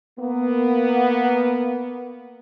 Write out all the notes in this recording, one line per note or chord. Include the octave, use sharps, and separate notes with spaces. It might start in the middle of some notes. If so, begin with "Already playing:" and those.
A#3 B3